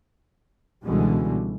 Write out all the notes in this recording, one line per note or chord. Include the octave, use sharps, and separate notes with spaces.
C#2 B2 D3 E3 G3 G#3